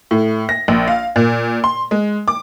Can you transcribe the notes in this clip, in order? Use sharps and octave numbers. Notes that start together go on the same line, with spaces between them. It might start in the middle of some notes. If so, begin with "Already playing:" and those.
A2
A#6
A#1
F5
A#2
C6
G#3
D6